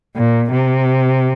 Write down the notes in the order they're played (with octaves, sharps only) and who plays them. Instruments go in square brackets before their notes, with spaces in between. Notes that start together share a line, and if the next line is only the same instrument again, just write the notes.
[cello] A#2
C3